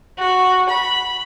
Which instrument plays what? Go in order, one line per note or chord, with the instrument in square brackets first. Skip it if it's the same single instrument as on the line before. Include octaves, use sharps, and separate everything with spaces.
[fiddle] F#4
B5